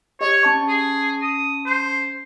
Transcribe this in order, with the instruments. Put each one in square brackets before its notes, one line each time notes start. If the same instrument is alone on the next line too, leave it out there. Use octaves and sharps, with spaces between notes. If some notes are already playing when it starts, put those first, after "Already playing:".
[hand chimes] G4 D#5 [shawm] C#5
[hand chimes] C#4 A5 C#6
[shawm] G#4
D#6
C5